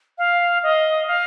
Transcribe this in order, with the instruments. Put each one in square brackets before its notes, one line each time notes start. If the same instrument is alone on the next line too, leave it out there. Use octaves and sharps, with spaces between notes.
[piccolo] F5
D#5
F5